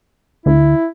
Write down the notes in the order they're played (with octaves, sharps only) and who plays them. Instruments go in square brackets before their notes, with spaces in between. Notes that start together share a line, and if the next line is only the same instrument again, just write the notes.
[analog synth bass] D2 [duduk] E4